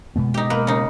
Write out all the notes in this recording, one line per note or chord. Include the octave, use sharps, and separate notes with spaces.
B2 G#3 B3
D#4 G4
A#3 B4
C#3 D#4